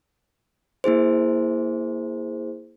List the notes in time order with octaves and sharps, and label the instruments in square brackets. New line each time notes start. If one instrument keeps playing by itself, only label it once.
[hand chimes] A#3 E4 G#4 C5